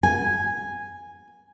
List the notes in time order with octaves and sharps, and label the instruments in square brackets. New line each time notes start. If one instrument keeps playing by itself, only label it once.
[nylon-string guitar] G#5